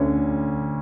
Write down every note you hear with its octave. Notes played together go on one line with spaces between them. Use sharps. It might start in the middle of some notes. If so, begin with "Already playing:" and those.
Already playing: D2 D3 C#4